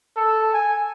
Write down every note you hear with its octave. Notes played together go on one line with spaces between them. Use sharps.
A4
G#5